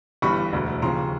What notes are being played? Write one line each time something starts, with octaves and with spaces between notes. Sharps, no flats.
G1 G2 E3 G3 B5 C#6
E1 D2 D3
D#2 C#3 F3 A#5 C6